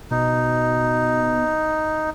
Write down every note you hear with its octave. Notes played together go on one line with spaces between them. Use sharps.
B2 D#4